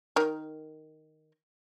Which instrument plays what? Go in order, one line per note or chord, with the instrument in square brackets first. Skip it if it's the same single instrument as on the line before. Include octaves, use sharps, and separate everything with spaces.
[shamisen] D#3 A#4